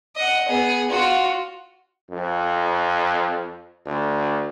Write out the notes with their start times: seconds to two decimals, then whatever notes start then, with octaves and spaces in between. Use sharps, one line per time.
0.16 D#5 F#5
0.47 B3 G#4
0.90 F4 F#4
2.10 F2
3.86 D2